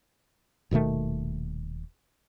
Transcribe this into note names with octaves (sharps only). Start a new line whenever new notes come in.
D#1 B2 D#3 A3